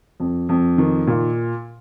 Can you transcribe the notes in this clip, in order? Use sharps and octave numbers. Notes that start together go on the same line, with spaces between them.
F2
F2
D#3
A#2